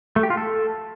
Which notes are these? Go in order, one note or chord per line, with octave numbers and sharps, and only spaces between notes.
A3
G4
F4
A4